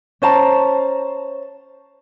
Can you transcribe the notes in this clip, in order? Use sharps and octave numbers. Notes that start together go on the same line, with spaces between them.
C#4 C5 A5 A#5